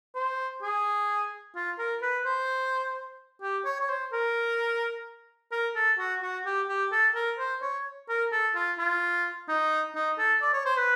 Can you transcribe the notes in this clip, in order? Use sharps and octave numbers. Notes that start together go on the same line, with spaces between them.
C5
G#4
F4
A#4
B4
C5
G4
C#5
C#5
C5
A#4
A#4
A4
F#4
F#4
G4
G4
A4
A#4
C5
C#5
A#4
A4
F4
F4
D#4
D#4
A4
D5
C#5
C5
B4